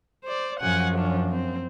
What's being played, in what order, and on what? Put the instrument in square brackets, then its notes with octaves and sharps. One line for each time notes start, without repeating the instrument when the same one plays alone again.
[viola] C5 D5
[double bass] F#2 F3 [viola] F#5 G#5
[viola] C#4 D4
C4